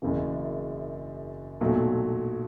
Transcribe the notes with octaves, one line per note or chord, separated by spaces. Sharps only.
F#1 F#2 C#3 E3
B1 A#2 F#3 A3